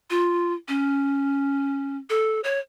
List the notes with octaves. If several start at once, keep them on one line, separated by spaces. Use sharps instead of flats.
F4
C#4
A4
C#5